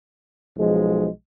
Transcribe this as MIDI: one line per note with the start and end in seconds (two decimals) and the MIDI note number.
0.57 1.08 35
0.57 1.08 53
0.57 1.08 56